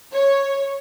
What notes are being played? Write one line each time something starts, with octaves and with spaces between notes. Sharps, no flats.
C#5